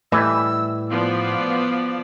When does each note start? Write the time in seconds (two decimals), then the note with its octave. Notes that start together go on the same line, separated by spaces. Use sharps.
0.12 A2 E3 G3 A3 D#5 E6
0.91 F3 B3 D5 F5